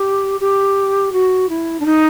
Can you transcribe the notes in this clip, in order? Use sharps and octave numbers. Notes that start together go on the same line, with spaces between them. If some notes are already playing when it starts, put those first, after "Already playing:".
Already playing: G4
G4
F#4
E4
D4
D#4